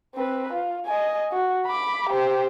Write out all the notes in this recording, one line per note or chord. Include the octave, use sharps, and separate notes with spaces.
C4 B4
F4
D#5 G#5
F#4
B5 D6
G4 C5